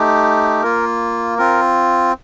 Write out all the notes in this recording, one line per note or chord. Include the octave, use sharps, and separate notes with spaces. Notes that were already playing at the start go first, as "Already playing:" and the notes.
Already playing: A3 D#4 G4
A#3 F4 A#4
C4 F4 A#4